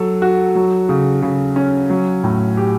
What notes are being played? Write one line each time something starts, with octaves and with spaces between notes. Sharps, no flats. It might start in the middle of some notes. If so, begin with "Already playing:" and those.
Already playing: F#3 A4
F#4
F#3
C#3
C#3
C#4
F#3
A2
G4